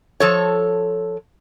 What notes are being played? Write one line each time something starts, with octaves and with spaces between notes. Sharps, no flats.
F3 A4 C#5